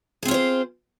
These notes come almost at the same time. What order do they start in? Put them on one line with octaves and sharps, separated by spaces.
G#4 C4 F4 C#5 C5